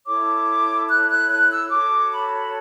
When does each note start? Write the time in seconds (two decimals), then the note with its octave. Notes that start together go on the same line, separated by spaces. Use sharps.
0.05 E4 A4 C#5 D6
0.88 F#6
1.08 F#6
1.29 F#6
1.49 E6
1.70 F#4 A4 C#5 D6
2.12 B5